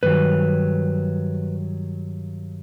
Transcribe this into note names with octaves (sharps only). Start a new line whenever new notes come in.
G2 D#3 F#3 B4